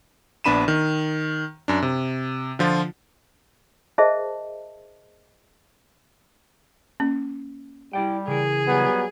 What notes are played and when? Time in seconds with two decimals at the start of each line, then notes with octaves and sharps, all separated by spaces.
0.44 A#1 B3 D4 B5 D#7 E7
0.68 D#3
1.68 F#2 D4
1.82 C3
2.59 D3 F3 F4
3.98 G#4 A#4 C5 D#5 E5 A5
7.00 A#3 C#4
7.93 G3 E4 D5 G5
8.28 C#3 E3 G#4 A#4
8.67 F#3 G3 B3